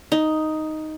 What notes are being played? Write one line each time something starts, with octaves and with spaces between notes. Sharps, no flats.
D#4